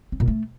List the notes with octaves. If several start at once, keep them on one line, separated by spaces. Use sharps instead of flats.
C4
A#2
A3